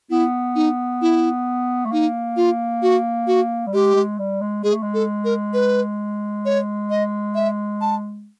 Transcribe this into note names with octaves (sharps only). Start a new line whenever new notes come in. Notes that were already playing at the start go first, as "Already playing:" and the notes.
B3 E4
D#4
E4
A3
A#3 D#4
F4
F#4
F#4
G3
G#3 G4
G#3
G3
G#3
G#3 G#4
A3
G#3
A4
A#4
B4
C#5
D#5
E5
A5